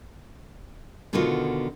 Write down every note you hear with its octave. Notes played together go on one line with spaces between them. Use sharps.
B2 D3 D#3 B3 F4 F#4